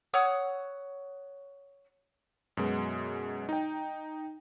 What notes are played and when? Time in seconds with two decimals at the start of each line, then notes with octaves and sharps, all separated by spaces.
0.14 C#5 F#5 D#6 E6
2.57 F#2 B2 G#3
3.49 D#4 G5